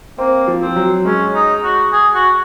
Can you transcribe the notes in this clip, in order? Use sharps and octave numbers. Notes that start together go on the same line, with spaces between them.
A#3 C4
F3
F3 C4
F#3
G#3 C#4
D#4
F#4
G#4
F#4